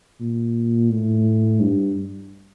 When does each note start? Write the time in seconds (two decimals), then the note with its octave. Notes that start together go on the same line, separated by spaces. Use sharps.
0.20 A#2
0.90 A2
1.60 G2